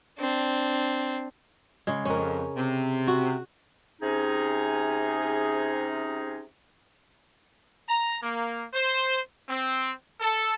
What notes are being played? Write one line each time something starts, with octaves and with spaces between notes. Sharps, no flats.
C4 D4
C#3 G#3
F2 C#4 A#4
C3
F#4
C3 C#4 D#4 G#4
A#5
A#3
C5
C4
A4